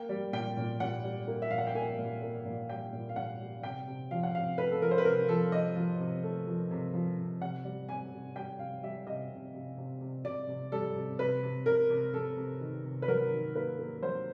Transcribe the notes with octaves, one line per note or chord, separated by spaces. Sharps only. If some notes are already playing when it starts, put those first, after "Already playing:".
Already playing: A#3 G5
G3
A#2 G5
A#2
A#2 F#5
G3
A#3
E5
A#2 F5
F#5
G5
A#3 G#5
A#2
A#3
A#2
G3 G5
A#2
F5
A#2 F#5
G3
C3 G5
C3
F3 F5
F#5
C3 F5
A3 B4
A4
F3 A#4
C5
B4
C3 A#4
F3 A4
F3 D#5
F3
C3
A3
F3
C3
F3
C3
C3 F#5
G3
C3 G#5
C3
G3 G5
C3 F5
G3 E5
C3 D#5
C3
C3
C3
C3
C3 D5
C3
G3 A4
C3
C3 B4
C3
C3 A#4
C3
C3 A4
C3
D#3
C3
B4
F#3 A#4
D#3
A#3 B4
A#3
F#3 C5